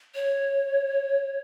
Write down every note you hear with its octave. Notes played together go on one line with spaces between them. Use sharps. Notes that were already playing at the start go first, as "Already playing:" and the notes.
C#5